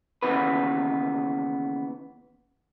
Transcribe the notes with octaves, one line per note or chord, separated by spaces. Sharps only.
D#2 C#3 E3 B3 B4